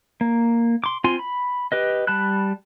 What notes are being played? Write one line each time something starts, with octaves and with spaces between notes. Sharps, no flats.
A#3
C6 D6
C4 F4 G#5 C6
B5
G4 B4 D#5
G3 A5 B5 F#6